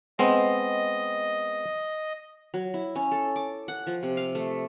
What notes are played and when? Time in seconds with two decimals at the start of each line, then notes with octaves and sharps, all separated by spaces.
0.19 G#3 B3 C4 D#5
2.54 F#3
2.74 E4
2.96 C#4
3.12 A4
3.36 D6
3.68 F#5
3.87 F3
4.03 C3
4.17 F5
4.35 A3